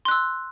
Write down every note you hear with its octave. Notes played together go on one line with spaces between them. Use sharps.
C6 E6 F#6